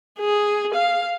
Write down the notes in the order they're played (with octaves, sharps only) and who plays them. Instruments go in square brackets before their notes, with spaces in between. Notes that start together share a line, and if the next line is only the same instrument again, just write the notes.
[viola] G#4
F5